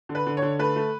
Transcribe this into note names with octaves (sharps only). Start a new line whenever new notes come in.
D3
B4
D3
C#5
D3
A3 B4
A3